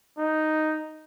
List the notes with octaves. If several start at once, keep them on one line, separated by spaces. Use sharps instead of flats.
D#4